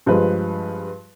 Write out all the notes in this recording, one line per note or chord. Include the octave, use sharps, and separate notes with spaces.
G2 F3 G#3 G#4 B4